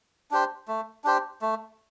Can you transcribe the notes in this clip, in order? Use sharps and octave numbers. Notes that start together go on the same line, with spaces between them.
D4 G4 C5
A3
D4 G4 C5
A3